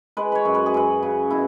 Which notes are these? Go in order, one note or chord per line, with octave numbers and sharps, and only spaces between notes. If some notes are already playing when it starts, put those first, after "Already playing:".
G#3 B4
B4 C#5
F#2
B4
G#4
F#2 B4
C#3
B2 E4